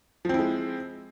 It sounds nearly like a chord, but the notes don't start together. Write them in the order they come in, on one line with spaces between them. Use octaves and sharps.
F3 C4 E4 G#3